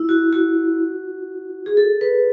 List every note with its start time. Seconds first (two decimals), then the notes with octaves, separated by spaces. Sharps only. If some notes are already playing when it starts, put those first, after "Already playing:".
Already playing: E4
0.09 F#4
0.33 F#4
1.66 G#4
1.77 A4
2.01 B4